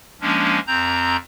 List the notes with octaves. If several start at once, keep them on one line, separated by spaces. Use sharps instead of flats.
F3 G#3 A#3 C#4 D4
F2 C4 A#5 G6